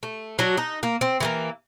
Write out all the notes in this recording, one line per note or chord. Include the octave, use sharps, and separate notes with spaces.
A3
F#3 D4 F#4
D#4
A#3
C4
E3 A3 A#3